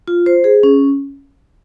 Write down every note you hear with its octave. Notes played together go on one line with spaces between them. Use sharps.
F4
C5
G#4
C#4